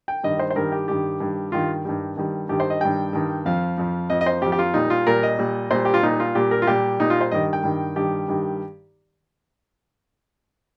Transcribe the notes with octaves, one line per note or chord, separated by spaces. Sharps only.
G5
G2 D#3 G3 D#5
C5
C5
G2 D#3 G3 A#4
G4
G2 D#3 G3 G4
G2 D#3 G3
G2 D#3 G3 F4
G2 D#3 G3
G2 D#3 G3
G2 D#3 G3 G4
C5
D#5
G2 D#3 G3 G5
G2 D#3 G3
F2 F3 F5
F2 F3
F2 F3 D#5
D#5
C5
F2 F3 G4
G4
F4
A#2 G3 D#4
F4
A#2 G3 A#4
D#5
A#2 G3
A#2 G3 C5
G4
F4
A#2 G3 D#4
F4
A#2 G3 G4
A#4
F4
A#2 G3 G4
A#2 G3 D#4
F4
C5
G2 D#3 G3 D#5
G5
G2 D#3 G3
G2 D#3 G3 G4
G2 D#3 G3